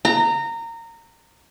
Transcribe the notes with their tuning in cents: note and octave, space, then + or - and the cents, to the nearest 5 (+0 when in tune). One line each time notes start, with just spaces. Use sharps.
A#5 -20